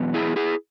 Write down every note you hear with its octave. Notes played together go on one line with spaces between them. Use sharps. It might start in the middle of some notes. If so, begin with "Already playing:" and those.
Already playing: E2 B2 F#3 B3
E4 G#4
E4 G#4